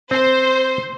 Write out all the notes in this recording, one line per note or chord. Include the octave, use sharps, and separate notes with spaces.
C4 C5